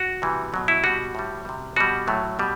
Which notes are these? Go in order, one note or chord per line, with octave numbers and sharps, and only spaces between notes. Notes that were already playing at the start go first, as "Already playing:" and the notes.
Already playing: F#4
C3 E3 G3
B2 F#3 A3
E4
B2 G3 F#4
A2 G3
C3 G3
B2 G3 F#4
A2 F#3 A3
B2 G3